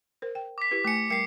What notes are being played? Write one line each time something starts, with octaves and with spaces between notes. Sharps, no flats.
A#4 C5
G5
D6 B6
E4 G4 B4
A3 G#5 D6 C#7
G3 A#4 G5 C7 C#7